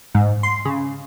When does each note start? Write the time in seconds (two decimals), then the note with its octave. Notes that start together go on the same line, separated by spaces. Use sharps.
0.15 G#2
0.43 C6
0.65 C#3